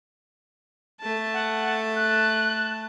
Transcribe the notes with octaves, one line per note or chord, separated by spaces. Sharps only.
A3 A5
F#5
F#6